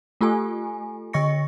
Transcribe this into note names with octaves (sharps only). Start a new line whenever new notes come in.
A3 F4 G4 A4 G#5
D3 D#5 C#6 A#6 C#7